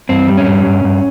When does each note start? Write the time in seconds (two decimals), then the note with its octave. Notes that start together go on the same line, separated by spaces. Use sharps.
0.09 G2 C4
0.28 G3
0.37 C#4
0.47 G2
0.66 G2
0.84 G2